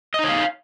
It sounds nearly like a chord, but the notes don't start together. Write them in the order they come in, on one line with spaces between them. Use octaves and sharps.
D#5 D#4 C#5 F5